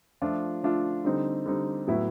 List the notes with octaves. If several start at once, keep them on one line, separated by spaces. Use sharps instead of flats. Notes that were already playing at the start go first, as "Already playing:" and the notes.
F3 A3 D4 F4
F3 A3 D4 F4
D3 G3 C4 D#4
D3 G3 C4 D#4
A2 F#3 B3 E4